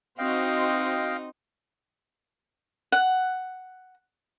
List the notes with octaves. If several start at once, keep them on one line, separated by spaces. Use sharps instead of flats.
C4 D#4 F#4 C5 D#5 F5 G5 C6
F#5